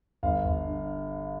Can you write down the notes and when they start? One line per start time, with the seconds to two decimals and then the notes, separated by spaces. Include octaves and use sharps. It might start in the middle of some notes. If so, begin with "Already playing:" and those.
0.23 G1 F5
0.45 G1
0.67 G2